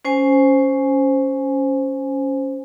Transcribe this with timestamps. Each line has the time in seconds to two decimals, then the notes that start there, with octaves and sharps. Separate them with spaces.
0.05 C#4 C5 G#5